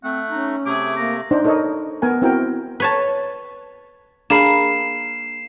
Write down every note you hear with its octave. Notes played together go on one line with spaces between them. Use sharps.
A3 C4 F#5
C#4 D#4
C3 A3 G#4 D6
A#3 A#5
D4 D#4 C5
D#4 A4 A#4 C#5 D#5
B3 A#4 G#5
C4 E4 F#4 A#4 G5
B4 C#5 A5
A#3 D4 G#4 B5 C7 E7